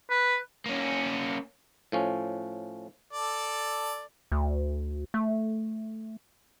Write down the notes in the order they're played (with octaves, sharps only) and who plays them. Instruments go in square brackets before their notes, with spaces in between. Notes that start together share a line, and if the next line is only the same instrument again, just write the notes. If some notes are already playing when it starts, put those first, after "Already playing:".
[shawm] B4
[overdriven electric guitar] A#3 C#4
[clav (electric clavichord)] A2 F3 C#4
[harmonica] A4 D5
[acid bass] D2
A3